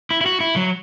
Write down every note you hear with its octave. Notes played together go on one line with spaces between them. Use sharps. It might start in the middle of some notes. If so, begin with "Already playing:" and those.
E4
E4
F#4
E4
F#3